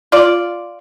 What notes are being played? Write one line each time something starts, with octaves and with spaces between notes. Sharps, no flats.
F4 D5